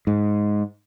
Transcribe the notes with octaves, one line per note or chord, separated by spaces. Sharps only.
G#2